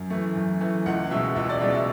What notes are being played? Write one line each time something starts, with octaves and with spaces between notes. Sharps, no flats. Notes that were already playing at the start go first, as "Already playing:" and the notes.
Already playing: F#2
E3 A3
F#2
E3 A3
C#2 F#5
B2 G#3 E5
C#2 E5
D5
B2 G#3 E5
E5